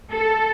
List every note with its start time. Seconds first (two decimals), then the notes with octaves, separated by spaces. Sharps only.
0.12 A4